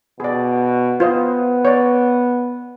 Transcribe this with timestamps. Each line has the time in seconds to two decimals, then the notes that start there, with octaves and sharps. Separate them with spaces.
0.20 B2 G#4 D5
1.00 B3 F4 C5 D#5
1.65 C#5 D5